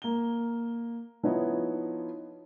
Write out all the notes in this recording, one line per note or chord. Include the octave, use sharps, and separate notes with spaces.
A#3 G7
F3 B3 D#4 E4 C#5 D#5